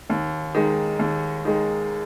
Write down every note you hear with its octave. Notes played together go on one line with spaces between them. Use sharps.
D#2
D#3 G#3
D#2
D#3 G#3